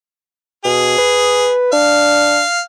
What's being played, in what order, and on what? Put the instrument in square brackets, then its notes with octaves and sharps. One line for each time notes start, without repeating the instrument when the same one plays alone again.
[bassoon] B2 [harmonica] G#4
[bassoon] B4
[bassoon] D4 [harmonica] F5